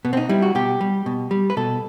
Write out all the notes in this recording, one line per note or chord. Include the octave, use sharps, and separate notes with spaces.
B2 B3
C4
D#4
G3 E4
F#4
B2 G4
G3
B2
G3
B4
B2 A4